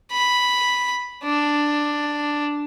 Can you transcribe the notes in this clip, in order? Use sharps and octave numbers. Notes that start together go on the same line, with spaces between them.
B5
D4